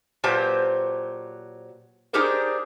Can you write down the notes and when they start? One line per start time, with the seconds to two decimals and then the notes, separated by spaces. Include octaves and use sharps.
0.24 A#2 F#3 G4 B4 C5 A5
2.13 D4 D#4 G4 G#4 A#4 C5